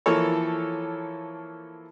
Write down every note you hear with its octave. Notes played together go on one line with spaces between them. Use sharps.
E3 F3 A#3 E4 A4 C#5